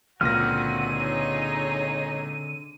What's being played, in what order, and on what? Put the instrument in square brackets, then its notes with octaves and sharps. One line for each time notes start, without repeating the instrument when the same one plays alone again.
[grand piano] C#2 A#2 A#6 [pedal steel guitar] D3 C4 F6 [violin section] F#4 [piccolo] D#7
[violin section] D#4 G#4 C#5